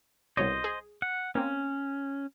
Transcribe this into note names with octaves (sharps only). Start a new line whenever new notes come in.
C2 B2 C5 C#5 D#5
G#4
F#5
A#3 C4 C#4